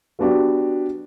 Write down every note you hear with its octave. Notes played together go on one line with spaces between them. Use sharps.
F#3 B3 D4 F#4 G4